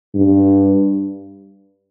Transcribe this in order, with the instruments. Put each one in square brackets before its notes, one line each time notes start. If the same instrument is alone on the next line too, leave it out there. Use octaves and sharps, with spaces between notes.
[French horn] G2